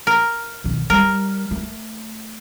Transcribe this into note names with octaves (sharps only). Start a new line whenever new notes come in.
A#4
B1 D#3
G3 A#4
A3